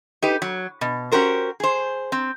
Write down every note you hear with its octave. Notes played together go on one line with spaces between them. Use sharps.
D#4 G4 B4
F#3
B2
C#4 F#4 G4 A#4 C5
G#4 C5
C4